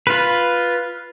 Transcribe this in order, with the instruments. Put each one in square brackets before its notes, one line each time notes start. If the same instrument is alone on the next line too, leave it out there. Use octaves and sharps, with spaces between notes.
[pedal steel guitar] F4 B4